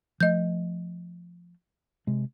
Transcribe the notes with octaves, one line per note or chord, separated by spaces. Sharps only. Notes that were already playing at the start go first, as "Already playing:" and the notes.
F3 A3 D#5 G6
C3 G#3